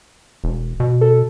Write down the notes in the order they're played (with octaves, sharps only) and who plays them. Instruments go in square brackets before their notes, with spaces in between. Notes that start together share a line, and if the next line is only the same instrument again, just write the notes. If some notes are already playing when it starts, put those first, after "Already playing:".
[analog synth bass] E1
B2
[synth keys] A4